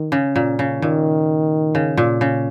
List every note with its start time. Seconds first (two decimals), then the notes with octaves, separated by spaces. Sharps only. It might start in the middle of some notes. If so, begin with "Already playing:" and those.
Already playing: D#3
0.12 C#3
0.36 A#2
0.59 C#3
0.82 A#2 D#3
1.75 C#3
1.97 A#2
2.21 C#3